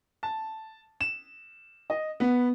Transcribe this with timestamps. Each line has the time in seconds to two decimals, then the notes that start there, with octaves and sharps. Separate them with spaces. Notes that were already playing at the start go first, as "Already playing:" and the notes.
0.23 A5
1.01 E7
1.90 D#5
2.20 B3